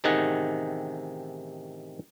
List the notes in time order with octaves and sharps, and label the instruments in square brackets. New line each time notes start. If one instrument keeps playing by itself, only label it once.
[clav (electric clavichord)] A1 C3 D#3 D#4 G#4 F#5